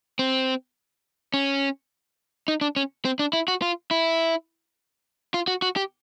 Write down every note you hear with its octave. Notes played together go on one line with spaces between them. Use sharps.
C4
C#4
D#4
D4
C#4
C4
D4
E4
F#4
F4
E4
F4
F#4
F#4
G4